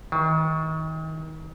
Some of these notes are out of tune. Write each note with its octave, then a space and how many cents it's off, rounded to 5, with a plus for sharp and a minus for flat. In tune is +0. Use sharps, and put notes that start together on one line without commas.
D#3 +35